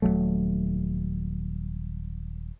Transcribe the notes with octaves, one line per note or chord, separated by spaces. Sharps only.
D#1 D2 F#3 A3